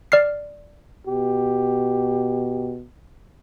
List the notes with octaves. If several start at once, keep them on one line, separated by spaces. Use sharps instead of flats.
D5 F6 C7
B2 G4